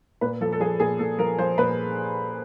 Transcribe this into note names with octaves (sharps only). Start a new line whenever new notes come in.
A#2 B4
F3 A4
A4
F3 G#4
A#2 G#4
A#2 A4
F3 A#4
F3 C5
A#2 B4